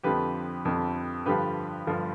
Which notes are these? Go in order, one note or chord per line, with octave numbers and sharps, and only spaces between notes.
F2 D3 F3 G4 B4
F2 D3 F3
G2 D3 F3 G4 B4
G2 D3 F3